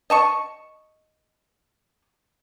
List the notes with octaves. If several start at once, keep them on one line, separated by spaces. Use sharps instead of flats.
D#5 A5 C#6